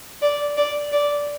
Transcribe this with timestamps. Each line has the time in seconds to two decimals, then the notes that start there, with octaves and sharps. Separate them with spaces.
0.22 D5
0.57 D5
0.92 D5